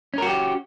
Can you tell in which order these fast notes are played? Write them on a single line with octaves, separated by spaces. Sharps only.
C#4 A#4 F#4 G4